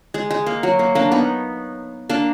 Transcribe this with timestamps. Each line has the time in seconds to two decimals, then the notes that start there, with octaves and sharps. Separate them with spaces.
0.14 G#3
0.31 G#3
0.46 A#3
0.63 F#3
0.79 A#3
0.95 A#3 D4
1.12 B3 D#4
2.10 A#3 D4